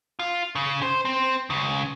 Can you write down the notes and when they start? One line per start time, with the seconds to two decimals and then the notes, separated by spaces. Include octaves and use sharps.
0.19 F4
0.55 C#3
0.82 C5
1.05 C4
1.50 C#2 C#3